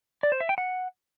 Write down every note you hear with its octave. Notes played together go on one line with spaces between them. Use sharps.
D5
C5
E5
G5
F#5